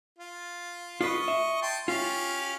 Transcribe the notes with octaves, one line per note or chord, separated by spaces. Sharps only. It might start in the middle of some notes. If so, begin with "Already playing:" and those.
F4
F4 B4 D#5 C#6
E5
G5 A5 C6
C#4 F4 G4 F5